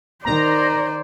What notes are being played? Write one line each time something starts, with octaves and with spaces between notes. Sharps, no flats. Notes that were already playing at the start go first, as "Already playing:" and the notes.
D#3 C5 D5 A#5